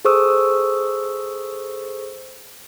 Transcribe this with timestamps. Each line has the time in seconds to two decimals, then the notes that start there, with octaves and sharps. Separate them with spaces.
0.05 G#4 A4 C5 C#6 D#6 E6